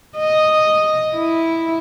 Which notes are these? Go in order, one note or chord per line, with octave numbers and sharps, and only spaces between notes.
D#5
E4